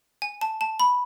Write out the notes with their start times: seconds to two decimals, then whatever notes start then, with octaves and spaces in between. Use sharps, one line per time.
0.22 G#5
0.41 A5
0.61 A5
0.80 B5